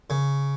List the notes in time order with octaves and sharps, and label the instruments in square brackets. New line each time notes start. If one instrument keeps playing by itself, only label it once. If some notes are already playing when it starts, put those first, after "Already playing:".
[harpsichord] C#3